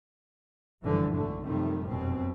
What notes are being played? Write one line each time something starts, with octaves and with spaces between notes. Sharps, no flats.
F#1 C2 G2 D3 E3 F3
B1 G#2 D3 A3
F#2 C3 D#3 F3 G3 A3
F1 F#2 B2 C4